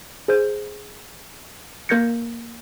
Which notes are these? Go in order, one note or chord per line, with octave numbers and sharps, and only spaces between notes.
G#4 C5 G6
A#3 A#4 G6 G#6 A#6 C#7